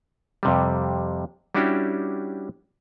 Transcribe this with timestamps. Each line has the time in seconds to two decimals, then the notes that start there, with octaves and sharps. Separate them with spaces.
0.43 F2 C3 G3
1.55 G3 C#4 D4 E4 F#4 G4